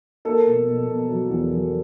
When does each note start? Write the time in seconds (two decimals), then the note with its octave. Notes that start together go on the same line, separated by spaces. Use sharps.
0.25 A#3 A4
0.46 B2
0.67 B2
0.88 B2
1.09 F#3
1.29 E2
1.50 F#3